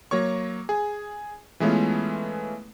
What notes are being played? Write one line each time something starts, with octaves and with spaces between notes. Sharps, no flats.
F#3 A#3 C#5 C#6
G#4
E3 G#3 A3 B3 C#4 F4